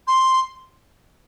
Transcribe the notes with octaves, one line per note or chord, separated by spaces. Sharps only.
C6